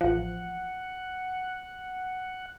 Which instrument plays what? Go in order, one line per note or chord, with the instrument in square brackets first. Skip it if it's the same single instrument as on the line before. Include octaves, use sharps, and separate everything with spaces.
[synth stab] A1 F3 [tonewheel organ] F#5